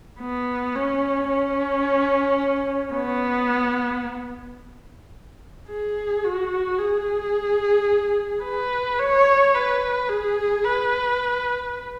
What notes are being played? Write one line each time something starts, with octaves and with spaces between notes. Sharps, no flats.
B3
C#4
C#4
B3
G#4
F#4
G#4
B4
C#5
B4
G#4
B4